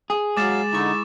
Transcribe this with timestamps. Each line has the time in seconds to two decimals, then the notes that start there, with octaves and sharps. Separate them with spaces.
0.10 G#4
0.37 F#3 G#3 F5 D6 A6 E7
0.72 D3 D#4 E4 C#6 E6